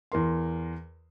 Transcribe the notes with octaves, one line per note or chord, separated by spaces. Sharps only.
E2 A#4 C6